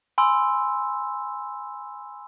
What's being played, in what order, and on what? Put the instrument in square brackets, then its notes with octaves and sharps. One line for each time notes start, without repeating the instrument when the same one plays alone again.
[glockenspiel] G#5 B5 C6 E6